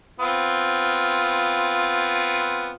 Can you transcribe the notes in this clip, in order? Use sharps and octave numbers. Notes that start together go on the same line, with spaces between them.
B3 C4 F4